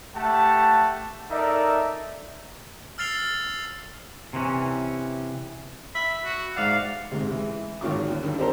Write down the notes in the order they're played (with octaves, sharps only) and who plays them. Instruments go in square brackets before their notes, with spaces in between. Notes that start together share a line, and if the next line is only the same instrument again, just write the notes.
[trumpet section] A3 G4 F#5 A5
D#4 A4 A#4 D5 E5
[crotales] E6 F6 A6 C7 F7 G7
[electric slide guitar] C3 E3 C#4
[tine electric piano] E5 [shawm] B5
[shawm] F#4
[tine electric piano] G#2 D5 F#5 [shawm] F5
[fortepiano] G#2 C3
E3 G#3
G#1 D#3 F#3 F4 C#6 D6
D#2
G2 D#3
C4 G4 A4 A#4 C5 A#5